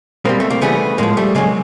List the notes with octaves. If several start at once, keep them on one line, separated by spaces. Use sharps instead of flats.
B2 G3 A#3 C4
A3
A#3
C#3 E3 G3 A3 B3
A2 F3 G#3 A#3
G3 A3
C#3 F#3 G#3 A#3